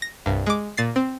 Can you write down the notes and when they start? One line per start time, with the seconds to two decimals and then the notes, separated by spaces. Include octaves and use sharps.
0.02 A#6
0.26 C2 G2
0.46 G#3 D6
0.77 A#2 A6 C7
0.96 C4